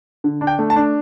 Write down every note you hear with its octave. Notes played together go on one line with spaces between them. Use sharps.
D3
D4
G5
A3
A5
D4